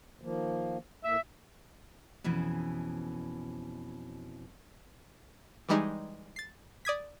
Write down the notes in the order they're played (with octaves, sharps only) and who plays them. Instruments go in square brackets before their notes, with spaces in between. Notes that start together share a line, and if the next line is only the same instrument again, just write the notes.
[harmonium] D#3 F3 A#3
[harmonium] A2 A#3 [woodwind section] E5
[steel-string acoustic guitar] F2 B2 E3 C#4
[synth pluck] E3 G3 G#3 D#4
A6 C7
D5 D#6 G#6 B6